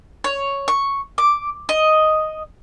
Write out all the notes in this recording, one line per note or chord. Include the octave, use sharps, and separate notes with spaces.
C#5
C#6
D6
D#5